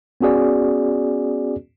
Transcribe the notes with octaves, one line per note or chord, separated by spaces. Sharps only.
B3 C#4 F#4 G#4 D5